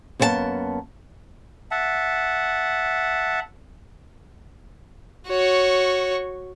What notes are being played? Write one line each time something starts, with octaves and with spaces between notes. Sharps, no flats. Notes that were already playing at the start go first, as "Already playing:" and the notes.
F#2 A#3 B3 A#4 A5
E5 F#5 A5
F#4 C#5